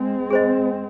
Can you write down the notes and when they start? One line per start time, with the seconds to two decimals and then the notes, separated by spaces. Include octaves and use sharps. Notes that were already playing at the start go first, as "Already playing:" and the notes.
Already playing: G#3 C4
0.30 G#4 C5 D#5